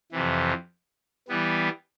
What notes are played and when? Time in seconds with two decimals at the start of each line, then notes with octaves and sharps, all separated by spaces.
0.12 F2 C3 E3
1.28 E3 G3 B3